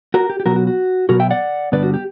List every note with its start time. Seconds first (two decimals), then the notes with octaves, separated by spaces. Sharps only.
0.14 F#4 A#4
0.30 G4
0.40 G4
0.46 B2 F#3 B3 F#4 A#4
0.56 F#4
0.67 F#4
1.09 B2 F#3 B3 F#4 A#4
1.20 E5 G5
1.31 D5 F#5
1.72 G2 D3 G3 B3 D4 B4 D5
1.83 F#4
1.94 G4